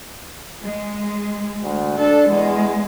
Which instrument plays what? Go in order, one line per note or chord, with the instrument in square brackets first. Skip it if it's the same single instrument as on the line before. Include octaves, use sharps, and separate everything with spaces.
[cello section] G#3
[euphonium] D2
[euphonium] D4 [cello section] A4
[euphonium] E2 [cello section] G#3